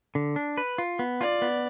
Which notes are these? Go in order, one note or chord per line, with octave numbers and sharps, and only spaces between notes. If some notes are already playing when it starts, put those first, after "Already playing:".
D3
D4
B4
F4
B3
F4 D5
B3